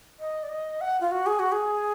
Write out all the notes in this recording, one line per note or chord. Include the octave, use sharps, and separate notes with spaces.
D#5
D5
D#5
F#5
F4
F#4
G#4
F#4
G#4